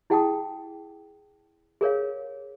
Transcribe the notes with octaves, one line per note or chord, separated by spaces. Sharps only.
E4 G#4 F#5 G5 A5 D#6
G#4 A#4 C#5 F5